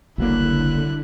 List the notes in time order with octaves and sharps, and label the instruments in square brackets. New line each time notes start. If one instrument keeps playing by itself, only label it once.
[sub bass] F#1 [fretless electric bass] C2 F#3 A#3 [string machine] D3 [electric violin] E4 F#6